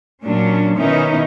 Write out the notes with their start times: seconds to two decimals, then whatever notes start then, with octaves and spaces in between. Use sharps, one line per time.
0.24 A#2 F#3 C#4 D4
0.77 B2 D#3 B3 C#4 D#4 E4